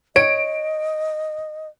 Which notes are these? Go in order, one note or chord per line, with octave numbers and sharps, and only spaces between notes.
C#5 D#5 D7